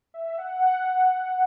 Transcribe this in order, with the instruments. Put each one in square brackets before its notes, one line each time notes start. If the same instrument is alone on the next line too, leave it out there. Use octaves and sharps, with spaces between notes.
[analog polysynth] E5
F#5